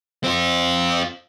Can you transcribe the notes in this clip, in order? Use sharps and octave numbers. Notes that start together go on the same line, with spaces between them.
C4 F4